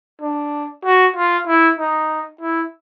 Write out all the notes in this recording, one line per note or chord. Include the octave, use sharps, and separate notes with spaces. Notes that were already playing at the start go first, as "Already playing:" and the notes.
D4
F#4
F4
E4
D#4
E4